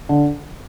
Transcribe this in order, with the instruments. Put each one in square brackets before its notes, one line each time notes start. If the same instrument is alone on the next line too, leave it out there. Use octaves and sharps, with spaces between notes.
[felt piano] D3